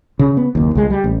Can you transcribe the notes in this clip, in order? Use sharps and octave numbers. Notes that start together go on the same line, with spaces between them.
C#3
B3
F#1 D#2
C#2 G#3
G3
A1